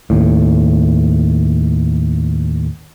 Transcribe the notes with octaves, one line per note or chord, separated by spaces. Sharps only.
D#2 A2